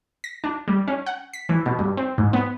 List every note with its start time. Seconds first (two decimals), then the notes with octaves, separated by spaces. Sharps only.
0.24 A#6
0.44 D4
0.68 G3
0.88 C#4
1.06 F#5
1.33 B6
1.49 E3
1.66 B2
1.79 G2
1.97 C4
2.18 G#2
2.33 B3